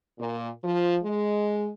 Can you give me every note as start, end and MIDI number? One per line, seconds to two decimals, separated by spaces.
0.19 0.49 46
0.62 0.96 53
1.03 1.69 56